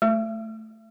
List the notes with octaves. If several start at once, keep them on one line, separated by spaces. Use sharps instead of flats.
A3